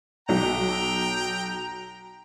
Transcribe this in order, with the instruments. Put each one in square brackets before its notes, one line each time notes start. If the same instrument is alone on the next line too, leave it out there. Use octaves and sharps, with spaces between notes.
[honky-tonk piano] B1 F#3 [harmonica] G5 A#5